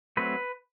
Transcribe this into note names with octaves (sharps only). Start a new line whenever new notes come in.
F#3 A3 C4 B4